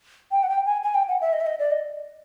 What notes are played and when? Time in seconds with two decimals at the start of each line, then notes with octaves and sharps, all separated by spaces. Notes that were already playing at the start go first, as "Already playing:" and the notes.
0.32 G5
0.43 F#5
0.49 G5
0.66 G#5
0.83 G#5
0.95 G5
1.08 F#5
1.21 E5
1.33 D#5
1.40 E5
1.46 D#5
1.59 D5
1.71 D#5